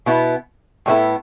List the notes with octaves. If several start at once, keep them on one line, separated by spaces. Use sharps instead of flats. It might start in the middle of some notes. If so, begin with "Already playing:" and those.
B2 B3 E4
A2 G3 B3 E4 A4